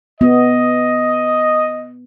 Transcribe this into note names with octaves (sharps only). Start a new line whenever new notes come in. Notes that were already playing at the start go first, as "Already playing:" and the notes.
B3 D#5